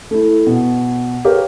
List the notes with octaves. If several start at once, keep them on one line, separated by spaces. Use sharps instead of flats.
A3 E4
B2
G4 A#4 B4 C#5 F5